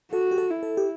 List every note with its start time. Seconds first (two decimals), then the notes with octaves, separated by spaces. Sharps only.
0.12 F#4 A4
0.31 G4
0.38 A4
0.50 E4
0.63 A4
0.77 G4